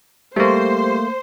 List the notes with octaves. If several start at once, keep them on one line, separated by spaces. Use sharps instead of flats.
G3 A3 A#3 C5 C#6